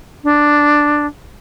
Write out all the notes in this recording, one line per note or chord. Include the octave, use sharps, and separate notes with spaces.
D4